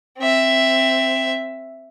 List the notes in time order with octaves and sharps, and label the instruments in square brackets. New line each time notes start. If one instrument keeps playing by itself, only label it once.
[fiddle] C4 E5